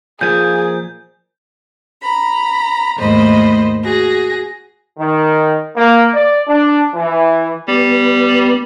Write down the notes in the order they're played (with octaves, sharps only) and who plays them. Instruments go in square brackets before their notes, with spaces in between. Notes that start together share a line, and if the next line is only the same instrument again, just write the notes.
[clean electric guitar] A#2 F3 G#5 [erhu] G#4 [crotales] G6
[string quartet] A#5 B5
D#2 G#2 A3 C5 D#5 B5
F#4 G#4 A#6
[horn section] D#3
A#3
D5
D4
E3
[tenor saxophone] G3 [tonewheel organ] B3